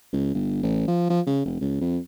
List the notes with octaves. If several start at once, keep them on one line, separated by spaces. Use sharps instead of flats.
C#2
G1
A1
F3
F3
C#3
F1
C#2
F2